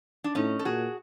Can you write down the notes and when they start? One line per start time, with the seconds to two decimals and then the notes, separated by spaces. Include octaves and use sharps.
0.24 D4
0.35 A2 C#4 D#4
0.59 A4
0.65 A#2 F#4 G#4